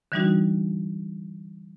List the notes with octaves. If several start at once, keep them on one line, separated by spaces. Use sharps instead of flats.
D3 E3 G3 D4 D#4 F#4